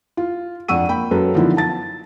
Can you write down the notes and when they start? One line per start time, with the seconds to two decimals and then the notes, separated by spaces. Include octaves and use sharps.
0.17 F4
0.68 F2 D4 F#5 C#6 E6 D#7
0.89 A#3 G5 B5
1.11 F#2 F#3 A4 B4
1.35 D3 D#3 F3 B3 E4
1.57 A5 A6